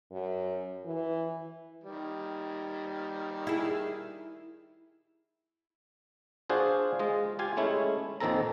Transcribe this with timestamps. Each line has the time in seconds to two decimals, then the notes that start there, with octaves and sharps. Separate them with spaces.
0.12 F#2
0.85 E3
1.84 D#3 G3
3.47 E4 G#4
6.49 D4 F4 F#4 G#4 C5
6.99 G#3 F4 D#5
7.39 F4 G4 F5 G#5
7.57 G#3 A3 C#4 E4
8.20 A#1 F2 D#3 C4 A4 A#5